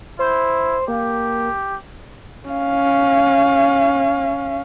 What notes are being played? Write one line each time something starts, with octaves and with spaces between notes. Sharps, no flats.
E4 C5
A#3 G4
C#4 F5